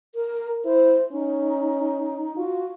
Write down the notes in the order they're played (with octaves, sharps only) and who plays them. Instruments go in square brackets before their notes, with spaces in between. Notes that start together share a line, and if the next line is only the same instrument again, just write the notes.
[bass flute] A#4
[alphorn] E4 [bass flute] C5
[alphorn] C#4 [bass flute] D#4
[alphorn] F4 [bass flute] F#4